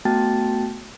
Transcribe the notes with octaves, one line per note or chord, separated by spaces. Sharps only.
A3 B3 F#4 G5 A5 A6